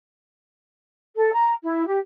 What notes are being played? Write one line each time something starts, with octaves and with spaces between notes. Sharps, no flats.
A4
A#5
E4
G4